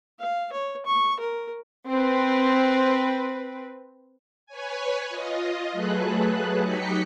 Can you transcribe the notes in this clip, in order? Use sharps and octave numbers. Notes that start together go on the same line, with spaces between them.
F5
C#5
C#6
A#4
C4 B4
B4 C#5 G#5
F4 D#5
F#3 A3 G#4 A4 B4 F#6
F#3 D#4 G4 D#5 B6 C#7